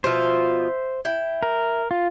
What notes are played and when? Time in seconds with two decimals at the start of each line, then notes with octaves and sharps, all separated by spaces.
0.04 B2 F3 F4 C5 E5
1.05 E4 G5
1.43 A#4
1.91 F4